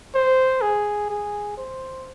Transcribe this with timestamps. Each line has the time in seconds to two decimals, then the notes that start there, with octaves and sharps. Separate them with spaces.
0.14 C5
0.62 G#4
1.10 G#4
1.58 C5